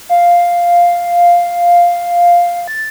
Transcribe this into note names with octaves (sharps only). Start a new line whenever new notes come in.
F5
A6